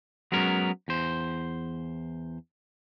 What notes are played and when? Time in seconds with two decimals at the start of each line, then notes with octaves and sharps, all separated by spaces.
0.32 F#3 G#3 B3 C#4 A#4
0.88 E2 C5